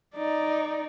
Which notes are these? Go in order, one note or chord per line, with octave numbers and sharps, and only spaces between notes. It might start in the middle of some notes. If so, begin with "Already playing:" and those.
D#4 D5